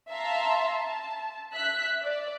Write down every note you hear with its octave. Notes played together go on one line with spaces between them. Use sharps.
E5 F5 A5 A#5 C6
A5
E5 F#6 B6
D5